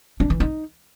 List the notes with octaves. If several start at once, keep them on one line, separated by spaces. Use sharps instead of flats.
D4
E3
D#4